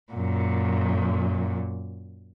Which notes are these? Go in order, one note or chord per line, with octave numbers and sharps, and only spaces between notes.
F#2 A#2